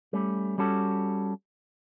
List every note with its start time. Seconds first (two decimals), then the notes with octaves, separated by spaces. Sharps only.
0.13 G3 A3 C#4
0.58 G3 C#4 F#4 A4